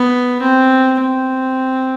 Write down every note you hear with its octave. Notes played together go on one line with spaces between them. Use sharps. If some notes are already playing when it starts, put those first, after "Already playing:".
Already playing: B3
C4
C4